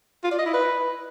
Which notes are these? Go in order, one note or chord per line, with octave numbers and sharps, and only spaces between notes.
F4
D5
D#5
E4
B4